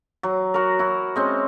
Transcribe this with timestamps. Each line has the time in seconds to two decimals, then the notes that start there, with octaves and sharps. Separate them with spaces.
0.23 F#3
0.54 F#4 A#4
0.79 E4 F#4
1.16 G#3 C4 C#4